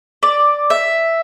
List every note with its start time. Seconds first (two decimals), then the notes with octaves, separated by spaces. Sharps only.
0.23 D5
0.70 E5